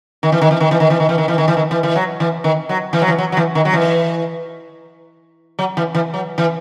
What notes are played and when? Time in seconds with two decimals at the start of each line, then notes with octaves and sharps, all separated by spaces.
0.23 D#3
0.32 E3
0.41 D#3
0.51 E3
0.60 D#3
0.71 E3
0.80 D#3
0.90 E3
1.00 D#3
1.09 E3
1.18 D#3
1.28 E3
1.38 D#3
1.48 E3
1.57 D#3
1.71 E3
1.83 E3
1.96 F#3
2.20 E3
2.44 D#3
2.69 F#3
2.93 E3
3.01 F#3
3.08 E3
3.18 F#3
3.32 F#3
3.37 E3
3.55 D#3
3.65 F#3
3.73 E3
5.59 F#3
5.77 E3
5.95 E3
6.14 F#3
6.38 E3